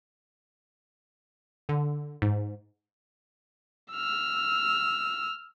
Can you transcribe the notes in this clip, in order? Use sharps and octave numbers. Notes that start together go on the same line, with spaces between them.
D3
G#2
E6 F6